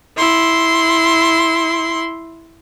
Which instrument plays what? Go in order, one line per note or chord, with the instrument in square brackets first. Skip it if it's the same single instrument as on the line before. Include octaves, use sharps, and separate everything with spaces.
[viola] E4 C6